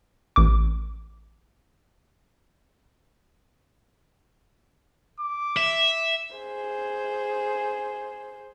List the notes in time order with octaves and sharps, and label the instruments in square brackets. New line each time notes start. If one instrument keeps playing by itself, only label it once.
[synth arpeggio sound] A1 D6
[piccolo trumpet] D6
[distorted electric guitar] E5
[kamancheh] G#4 C5